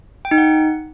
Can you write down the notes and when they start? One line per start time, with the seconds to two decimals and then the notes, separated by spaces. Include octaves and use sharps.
0.25 G5
0.31 D#4
0.38 F#5